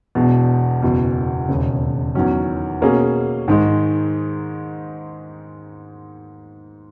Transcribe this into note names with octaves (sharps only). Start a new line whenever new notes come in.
E1 E2 B2
F#1 E2 B2
E1 D#2 C#3
E2 D#3 F#3 C#4
B2 A#3 C#4 G#4
G#2 D#3 G#3